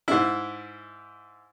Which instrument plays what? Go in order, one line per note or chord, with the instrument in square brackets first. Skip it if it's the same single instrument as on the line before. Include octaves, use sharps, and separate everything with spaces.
[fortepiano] G#2 E4